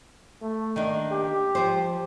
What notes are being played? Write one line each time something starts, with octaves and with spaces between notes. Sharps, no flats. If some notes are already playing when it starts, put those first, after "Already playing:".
A3
D#3 A#3 D4
G4
F3 C5